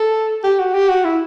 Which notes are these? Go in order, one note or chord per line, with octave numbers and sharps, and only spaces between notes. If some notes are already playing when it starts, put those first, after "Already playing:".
Already playing: A4
G4
F#4
G4
F#4
E4